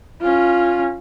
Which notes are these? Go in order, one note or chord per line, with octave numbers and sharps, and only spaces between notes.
C#4 F4